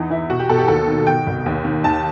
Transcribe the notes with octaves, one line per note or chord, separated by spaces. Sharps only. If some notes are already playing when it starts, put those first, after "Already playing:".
Already playing: E2 E3 D#4
E3 E4
B2 F#4
G4
B2 A4
G4
D#2 A4
D#3
B2 G5
C2
D#2
D#3
D#2 A5